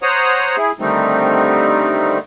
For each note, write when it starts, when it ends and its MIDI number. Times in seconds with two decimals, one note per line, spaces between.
0.02 0.56 72
0.02 0.56 73
0.02 0.56 78
0.02 0.56 82
0.02 0.56 87
0.57 0.71 64
0.57 0.71 68
0.80 2.18 50
0.80 2.18 51
0.80 2.18 55
0.80 2.18 57
0.80 2.18 60
0.80 2.18 63